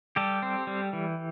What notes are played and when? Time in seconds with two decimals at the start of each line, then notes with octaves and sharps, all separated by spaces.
0.16 G3 G4 A4
0.42 C4
0.67 G3
0.93 E3